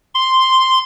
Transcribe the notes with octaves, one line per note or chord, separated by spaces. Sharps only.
C6